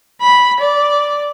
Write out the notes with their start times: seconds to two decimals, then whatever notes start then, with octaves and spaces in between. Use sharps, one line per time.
0.21 B5
0.60 D5